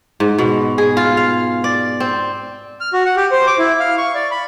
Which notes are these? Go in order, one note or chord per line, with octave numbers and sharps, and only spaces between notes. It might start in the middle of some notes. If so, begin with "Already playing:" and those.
G#2
B2
G#4
F4
F5
D5
C4
F6
F#4
F#5
G4
C5
D6
E4
F5
C#6
D5
B5